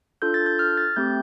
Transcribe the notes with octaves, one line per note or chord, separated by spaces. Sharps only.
D4 F4 A4 G6
A6
G6
F6
A6
A3 C4 G4 G6